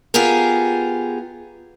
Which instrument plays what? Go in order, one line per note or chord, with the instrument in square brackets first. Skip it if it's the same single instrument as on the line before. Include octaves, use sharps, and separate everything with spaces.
[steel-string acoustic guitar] B3 F4 G4 G#4 A#4